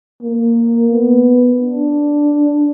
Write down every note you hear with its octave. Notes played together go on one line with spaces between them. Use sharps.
A#3
B3
D4